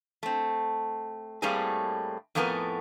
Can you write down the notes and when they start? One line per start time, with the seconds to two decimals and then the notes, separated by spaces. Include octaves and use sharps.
0.23 A3 C4
1.42 A2 G3 A3 A#3 C4 G#4
2.35 F2 A2 A3 B3 A#4 G#5